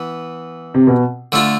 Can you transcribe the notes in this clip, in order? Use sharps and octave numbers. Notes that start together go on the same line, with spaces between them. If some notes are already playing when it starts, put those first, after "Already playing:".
Already playing: E3 B3
C3
B2
D3 A3 D4 F4